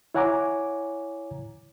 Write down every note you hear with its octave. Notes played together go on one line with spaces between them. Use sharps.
E4 C#5 F#5 G#5 A#5 D6